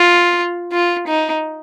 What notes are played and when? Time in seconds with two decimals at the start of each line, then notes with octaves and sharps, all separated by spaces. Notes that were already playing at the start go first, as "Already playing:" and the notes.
Already playing: F4
0.73 F4
1.07 D#4